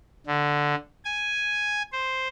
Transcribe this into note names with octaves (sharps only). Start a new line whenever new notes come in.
D3
G#5
C5